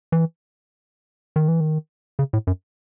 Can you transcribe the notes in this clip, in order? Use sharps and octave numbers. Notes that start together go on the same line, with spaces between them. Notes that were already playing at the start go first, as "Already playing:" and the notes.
E3
D#3
E3
D#3
C#3
A2
F#2